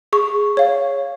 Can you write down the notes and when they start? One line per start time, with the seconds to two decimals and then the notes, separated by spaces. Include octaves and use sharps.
0.13 G#4 C#6
0.57 C#5 F5